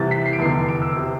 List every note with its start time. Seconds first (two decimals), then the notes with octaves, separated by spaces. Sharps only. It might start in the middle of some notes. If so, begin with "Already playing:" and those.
Already playing: C2 C3 E3 A6
0.11 B6
0.25 C7
0.33 D7
0.39 F1 E2 D3 C7
0.68 D7
0.81 E6
0.96 C3